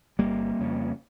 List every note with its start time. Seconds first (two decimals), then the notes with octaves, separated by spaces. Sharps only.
0.19 G1 G3 A#3
0.59 F2 C#3